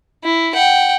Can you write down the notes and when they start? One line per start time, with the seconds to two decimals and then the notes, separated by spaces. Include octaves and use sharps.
0.24 E4
0.55 F#5 G5